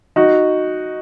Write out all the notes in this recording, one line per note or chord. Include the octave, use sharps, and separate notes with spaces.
D#4 F#4